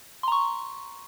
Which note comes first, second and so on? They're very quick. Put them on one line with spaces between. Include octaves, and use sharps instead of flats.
C6 A#5 C#6